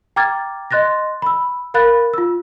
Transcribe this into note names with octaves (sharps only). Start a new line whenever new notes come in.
G5 A#5 D6 F6 G#6 A6
D#5 C6 F#6 A6 A#6
B5 E6
A#4 F5 B5 F#6 A6
F4 E6